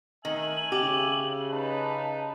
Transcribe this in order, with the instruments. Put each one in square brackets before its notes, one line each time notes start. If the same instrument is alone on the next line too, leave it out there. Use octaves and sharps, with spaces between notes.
[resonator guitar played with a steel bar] D#3 [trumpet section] A3 E5 G#5 [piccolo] F#7
[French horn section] C#3 [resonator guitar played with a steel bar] G4
[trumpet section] D#4 B4 [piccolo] A5